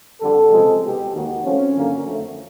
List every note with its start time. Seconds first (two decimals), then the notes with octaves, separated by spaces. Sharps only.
0.21 F2 D3 G3 A4
0.51 C#2 C3 F3 G#3 C4
0.82 C2 B2 G#3 G4
1.13 D#2 D#3 G#3 F#4
1.43 C2 C3 F3 A3 C#4
1.74 F#2 D3 F#3 A#3
2.05 F2 D3 F3 A3